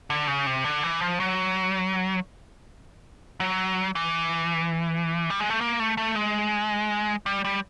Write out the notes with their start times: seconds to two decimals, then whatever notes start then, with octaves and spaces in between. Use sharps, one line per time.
0.10 D3
0.27 C#3
0.46 C3
0.64 D3
0.83 E3
1.01 F3
1.20 F#3
3.40 F#3
3.95 E3
5.30 G3
5.40 G#3
5.50 A3
5.61 A#3
5.80 A3
5.97 A3
6.16 G#3
7.26 G3
7.45 G3